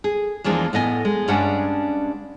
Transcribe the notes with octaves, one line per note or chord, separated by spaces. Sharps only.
G#4
E2 E3 F3 G#3 A#3 D4
A2 B3 D#5 G#5
G#3
G2 G3 G#3 C#4 D4 F#5